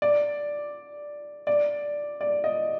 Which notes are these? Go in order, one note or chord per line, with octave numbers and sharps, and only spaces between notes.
D5
D5
D5
D#5